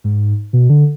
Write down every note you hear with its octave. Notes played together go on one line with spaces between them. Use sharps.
G#2
B2
D3